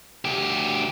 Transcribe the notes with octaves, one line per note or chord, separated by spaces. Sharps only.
D2 G4